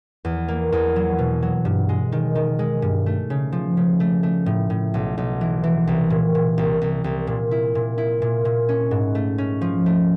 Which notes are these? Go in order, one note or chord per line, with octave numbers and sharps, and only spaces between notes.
E2
A#3
E2
F#3
B2
F#3
G2
G#3
D#3
D#3
G#3
G2
A3
C#3
F3
C#3
A3
A3
A2
A2
B1
B1
E3
E3
C2
A#2
A#2
C2
C2
C2
A#2
E4
A#2
E4
A#2
A#2
C#4
G#2
A3
C#4
F3
A3